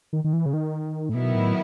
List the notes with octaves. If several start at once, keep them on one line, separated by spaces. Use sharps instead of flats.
D#3
D#3
E3
C#3
D#3
A2
B2 D#3 F#3 B3 E4
A2